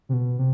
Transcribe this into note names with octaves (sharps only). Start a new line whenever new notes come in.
C3
B2
C3